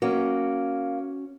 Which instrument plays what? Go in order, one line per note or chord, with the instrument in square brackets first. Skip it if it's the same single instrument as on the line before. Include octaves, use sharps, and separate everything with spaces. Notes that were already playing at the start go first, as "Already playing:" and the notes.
[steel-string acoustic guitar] A#3 [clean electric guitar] C#4 F#4